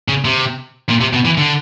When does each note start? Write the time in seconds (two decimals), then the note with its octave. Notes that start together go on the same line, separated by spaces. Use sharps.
0.08 C#3
0.25 C3
0.89 A#2
1.01 C3
1.13 B2
1.25 E3
1.38 D3